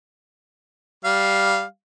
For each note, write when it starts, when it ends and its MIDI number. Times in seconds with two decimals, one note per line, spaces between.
1.05 1.63 55
1.05 1.63 77